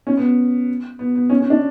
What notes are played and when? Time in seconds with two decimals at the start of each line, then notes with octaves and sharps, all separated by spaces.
0.07 C#4
0.17 B3
0.99 B3
1.15 B3
1.30 C#4
1.40 C#4
1.50 D4